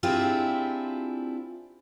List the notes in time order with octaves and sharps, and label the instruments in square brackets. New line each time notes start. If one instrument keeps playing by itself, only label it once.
[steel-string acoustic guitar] C4 D4 E4 F4 G4 G#4